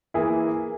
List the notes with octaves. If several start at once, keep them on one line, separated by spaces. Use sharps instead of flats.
E3 A#3 E4 G#4